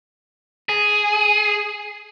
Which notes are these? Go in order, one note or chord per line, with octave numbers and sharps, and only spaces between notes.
G#4